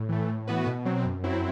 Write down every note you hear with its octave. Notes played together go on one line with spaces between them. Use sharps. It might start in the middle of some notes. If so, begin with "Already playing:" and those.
Already playing: A2
E3 A3
A2
E3 B3 F#4 B4
B2
F#3 C4
F#2
F#3 C4 E4